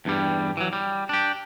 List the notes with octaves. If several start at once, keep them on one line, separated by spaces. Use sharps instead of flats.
E2 G2 G3
E3 F#3
G3
D4 G4